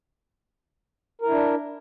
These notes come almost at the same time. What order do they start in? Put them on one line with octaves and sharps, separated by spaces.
A#4 E4 D4